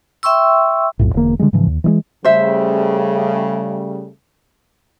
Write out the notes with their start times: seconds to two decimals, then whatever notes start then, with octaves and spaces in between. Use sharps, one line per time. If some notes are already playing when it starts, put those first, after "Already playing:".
0.23 E5 G5 C6 C#6 E6
0.99 B1 F2 A2
1.14 E1 D3 A#3
1.39 D3 F3 G3 G#3
1.53 G#2 C#3 E3 F3
1.67 D#2
1.84 E3 F#3 G#3
2.25 C#3 G3 A3 C5 E5